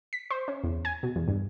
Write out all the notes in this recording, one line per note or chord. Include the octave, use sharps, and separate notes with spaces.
B6
C5
C#4
E2
G#5
B2
E2
G2